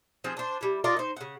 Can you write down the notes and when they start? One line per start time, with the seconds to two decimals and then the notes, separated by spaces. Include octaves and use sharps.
0.24 F3 C4 G#4
0.37 D4 C5
0.61 G3 E4
0.84 F4 A#4 D5 D#5
0.97 D#4 C5
1.17 C#3 F#5